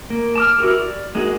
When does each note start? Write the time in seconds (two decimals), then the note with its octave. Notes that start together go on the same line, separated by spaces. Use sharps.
0.10 A#3
0.36 A5 D6 F6
0.59 E4 F#4 G4 A#4
0.77 D5
1.15 G#3 A#3 D#4 F#4 G#4